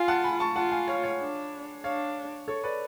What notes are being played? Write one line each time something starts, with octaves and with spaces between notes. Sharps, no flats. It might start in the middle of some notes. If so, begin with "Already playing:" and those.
Already playing: F4 F5 G#5
F#5 A5
G#5 B5
A5 C#6
F4 F#5 A5
F5 G#5
C#5 F5
C#5 F5
D4
D4 C#5 F5
A4 C#5
B4 D5